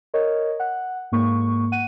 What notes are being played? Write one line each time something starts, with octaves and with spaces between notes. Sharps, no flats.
A#4 C#5 D#5
F#5
G#2 A#3 C#6
F#5 D#7